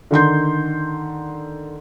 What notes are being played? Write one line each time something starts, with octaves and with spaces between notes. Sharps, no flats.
D3 D#3 C6 G6